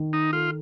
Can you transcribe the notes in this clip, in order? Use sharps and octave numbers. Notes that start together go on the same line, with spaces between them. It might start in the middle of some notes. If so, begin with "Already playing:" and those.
Already playing: D#3
D#4
F4 A4